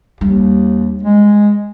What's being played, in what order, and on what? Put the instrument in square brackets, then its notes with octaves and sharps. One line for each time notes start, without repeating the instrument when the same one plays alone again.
[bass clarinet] D#2 [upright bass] G3 D4
[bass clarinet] G#3